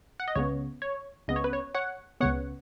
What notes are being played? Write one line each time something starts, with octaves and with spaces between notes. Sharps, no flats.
F#5
D#5
C#2 C#3 B3 C#5
C#5
C#2 C#3 B3 D#5
C#5
B4
C#5
C#5 F#5
C#2 C#3 B3 C#5 F#5